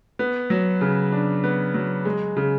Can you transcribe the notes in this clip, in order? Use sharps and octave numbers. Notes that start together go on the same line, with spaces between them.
B3
F#3
C#3
D4
B3
F#3
G#3
C#3